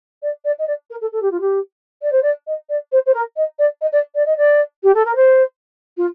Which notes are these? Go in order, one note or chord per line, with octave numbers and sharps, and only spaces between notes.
D5
D5
D#5
D5
A#4
A4
A4
G4
F4
G4
D5
C5
D5
D#5
D5
C5
C5
A#4
D#5
D5
D#5
D5
D5
D#5
D5
G4
A4
A#4
C5
F4